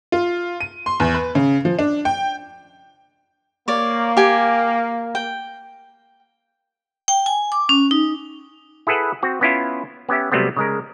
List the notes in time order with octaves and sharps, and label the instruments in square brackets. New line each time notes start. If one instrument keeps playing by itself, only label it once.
[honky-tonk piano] F4
D#7
C6
E2
B4
C#3
F3
D4
G5
[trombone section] A#3 [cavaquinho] C#5 D5
[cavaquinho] G4 G#5
G5
[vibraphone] G5
G#5
D6
C#4
D#4
[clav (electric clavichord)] E4 G#4 A4 B4 F#5
C4 F#4
B3 C#4 E4 F4
B3 C#4 G4 E5
C3 F#3 G3 A3 B3 C4
C#3 G#3 A#4